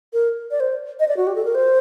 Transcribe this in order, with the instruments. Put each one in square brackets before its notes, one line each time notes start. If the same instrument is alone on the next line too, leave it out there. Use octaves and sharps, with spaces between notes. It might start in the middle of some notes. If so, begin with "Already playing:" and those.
[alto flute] A#4
D5
C5
D#5
D5
F#4
G4
A4
A#4
C5